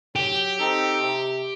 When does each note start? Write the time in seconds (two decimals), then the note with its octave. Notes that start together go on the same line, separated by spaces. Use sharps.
0.16 F#3 G4
0.58 C4 D#4 A4
1.00 C3